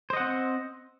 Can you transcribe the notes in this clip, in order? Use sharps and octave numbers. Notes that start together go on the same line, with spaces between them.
C4 C5 D#5 F#5